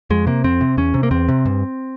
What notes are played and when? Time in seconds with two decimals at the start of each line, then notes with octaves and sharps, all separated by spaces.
0.10 F2 G#3
0.27 C3 A#3
0.44 F2 C4
0.61 C3
0.77 E2 C#4
0.94 C3
1.03 A#3
1.11 E2 C4
1.29 C3
1.45 G2